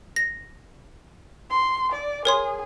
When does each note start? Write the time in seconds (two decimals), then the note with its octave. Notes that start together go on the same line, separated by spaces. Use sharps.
0.16 A#6
1.50 C6
1.92 D5
2.25 G#4 A#4 C#5 C6